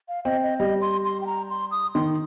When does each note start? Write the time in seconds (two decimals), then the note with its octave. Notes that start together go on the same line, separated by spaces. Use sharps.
0.08 F5
0.25 C4 D#5
0.43 D#5
0.59 G3 D#5
0.81 C6
1.05 C6
1.21 G5
1.26 A#5
1.50 C6
1.71 D#6
1.94 D#3 C6